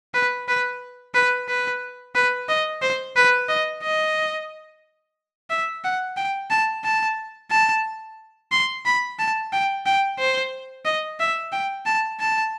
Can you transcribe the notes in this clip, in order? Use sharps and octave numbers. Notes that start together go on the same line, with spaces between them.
B4
B4
B4
B4
B4
D#5
C5
B4
D#5
D#5
E5
F#5
G5
A5
A5
A5
C6
B5
A5
G5
G5
C5
D#5
E5
G5
A5
A5